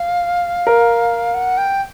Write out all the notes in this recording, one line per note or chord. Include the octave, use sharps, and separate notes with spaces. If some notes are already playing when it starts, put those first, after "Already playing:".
Already playing: F5
A#4
F#5
G5